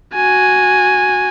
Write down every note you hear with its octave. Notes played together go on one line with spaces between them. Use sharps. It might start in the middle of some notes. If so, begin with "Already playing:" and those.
F#4 G#5